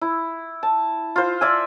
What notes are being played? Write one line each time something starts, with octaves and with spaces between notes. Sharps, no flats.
E4
A5
F4 C5
D5 E5 G#5